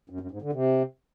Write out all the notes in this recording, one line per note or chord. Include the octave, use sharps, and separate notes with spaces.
F#2
F#2
G#2
D3
C3